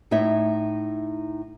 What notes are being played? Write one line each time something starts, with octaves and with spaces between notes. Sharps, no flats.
A2 D#4 E4 C#5 E5